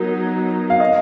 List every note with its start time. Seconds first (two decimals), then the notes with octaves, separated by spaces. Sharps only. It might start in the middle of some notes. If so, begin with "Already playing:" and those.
Already playing: F#3 B3 D#4 A#4
0.70 F5
0.80 D#5